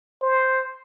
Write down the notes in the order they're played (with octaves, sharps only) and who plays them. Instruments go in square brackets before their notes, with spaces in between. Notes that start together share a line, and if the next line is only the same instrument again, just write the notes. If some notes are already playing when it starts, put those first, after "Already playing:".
[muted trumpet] C5